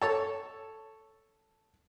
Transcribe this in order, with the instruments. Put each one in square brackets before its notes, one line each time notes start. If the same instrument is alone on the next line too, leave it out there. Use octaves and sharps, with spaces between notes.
[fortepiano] A4 C#5 A5